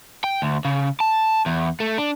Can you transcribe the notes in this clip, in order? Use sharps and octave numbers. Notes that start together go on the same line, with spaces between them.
G5
D2
C#3
A5
E2
A3
D4